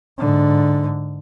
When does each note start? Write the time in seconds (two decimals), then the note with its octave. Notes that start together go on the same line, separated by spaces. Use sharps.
0.19 G#2 D3